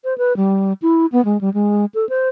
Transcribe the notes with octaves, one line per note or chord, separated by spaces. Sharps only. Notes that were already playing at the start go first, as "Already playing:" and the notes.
C5
B4
G3
E4
B3
G#3
G3
G#3
A4
C5